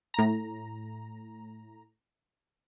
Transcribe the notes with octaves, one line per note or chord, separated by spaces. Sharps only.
A2 A#5